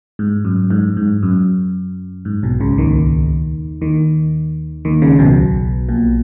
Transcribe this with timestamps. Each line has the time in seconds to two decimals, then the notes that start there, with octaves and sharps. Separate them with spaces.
0.19 G#2
0.45 F#2
0.70 G#2
0.97 G#2
1.23 F#2
2.25 G#2
2.43 B1 B2
2.61 C#2 C#3
2.78 D#2 D#3
3.81 D#2 D#3
4.85 D#2 D#3
5.02 C#2 C#3
5.19 B1 B2
5.89 A#1 A#2